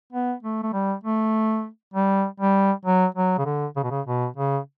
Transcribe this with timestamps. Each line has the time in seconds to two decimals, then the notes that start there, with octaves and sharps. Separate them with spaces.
0.13 B3
0.43 A3
0.63 A3
0.73 G3
1.04 A3
1.94 G3
2.40 G3
2.85 F#3
3.15 F#3
3.38 C#3
3.45 D3
3.76 C#3
3.83 B2
3.91 C#3
4.06 B2
4.37 C#3